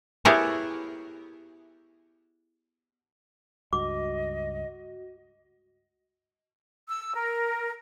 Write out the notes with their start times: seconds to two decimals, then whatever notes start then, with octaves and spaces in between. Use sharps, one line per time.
0.25 B3 E4 G4 G#4 A#4 C#5
3.73 C#2 G2 F#4 D#5 D6
6.88 E6
7.14 A#4